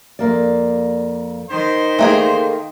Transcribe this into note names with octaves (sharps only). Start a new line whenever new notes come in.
F2 A#3 D5
D#3 C5
A3 A#3 G#4 G5